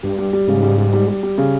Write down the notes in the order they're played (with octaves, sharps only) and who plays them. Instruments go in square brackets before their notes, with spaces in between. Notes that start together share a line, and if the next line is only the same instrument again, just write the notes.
[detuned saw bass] G2 [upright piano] G3
[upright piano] G3
G3
[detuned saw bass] G#2 [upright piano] C#3
[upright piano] G3
G3
G3
G3
G3
C#3